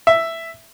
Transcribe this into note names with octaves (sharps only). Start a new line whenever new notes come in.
E5